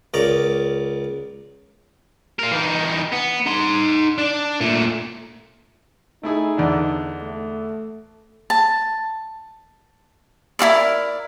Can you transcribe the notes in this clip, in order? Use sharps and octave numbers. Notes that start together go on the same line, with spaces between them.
C#2 A#4 D5
F4 A#4
E3 D#4
B3
D#4 C6
D4
A#2 A3
A3 D#4 E4 G#4
E2 D3 D4
A3
A5
E4 F#4 A#4 D5